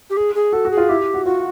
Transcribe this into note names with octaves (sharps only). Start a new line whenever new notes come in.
G4
G#4
G#4
F#4 A4
F#4
G#4
F4
E4 G4
F#4
F4 F#4